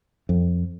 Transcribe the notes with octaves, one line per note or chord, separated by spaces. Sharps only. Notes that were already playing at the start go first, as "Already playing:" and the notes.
F2